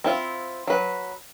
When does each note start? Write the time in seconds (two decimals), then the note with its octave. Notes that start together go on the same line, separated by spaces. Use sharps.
0.04 C4 E4 F4
0.67 F#3 B4